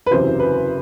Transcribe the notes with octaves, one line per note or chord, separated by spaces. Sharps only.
B4
F#1 E2 C3 F#3 C4 C5
B4